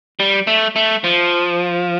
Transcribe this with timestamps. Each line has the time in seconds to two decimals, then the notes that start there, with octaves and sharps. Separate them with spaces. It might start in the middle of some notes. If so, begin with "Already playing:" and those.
0.20 G3
0.47 A3
0.76 A3
1.04 F3